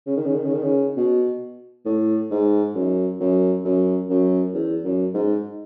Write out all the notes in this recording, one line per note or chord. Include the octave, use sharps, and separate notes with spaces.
C#3
D#3
C#3
D#3
C#3
D#3
C#3
B2
A2
G#2
F#2
F#2
F#2
F#2
E2
F#2
G#2